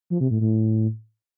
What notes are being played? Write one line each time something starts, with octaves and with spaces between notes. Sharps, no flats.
F3
C3
A2
A2